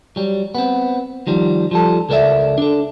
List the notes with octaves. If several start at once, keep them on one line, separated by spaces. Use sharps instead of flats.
F#3 G3
B3 C4
D#3 F3 G3
F3 G3 A4
C#2 A4 A#4 C#5 D5 E5
D4 A4